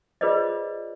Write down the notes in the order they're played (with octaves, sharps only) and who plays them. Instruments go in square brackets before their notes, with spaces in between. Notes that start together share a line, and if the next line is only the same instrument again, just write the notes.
[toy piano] F4 G#4 B4 C5 D5 D#5